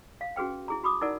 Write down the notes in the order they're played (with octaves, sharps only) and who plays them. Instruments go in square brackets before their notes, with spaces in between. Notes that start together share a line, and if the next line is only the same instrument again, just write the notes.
[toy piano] F5
C#4 F#4 G#4 B4 G5
E4 G#4 A#5
F#4 B5 D6 D#6
D#4 E4 A#4 D5 F#5 A5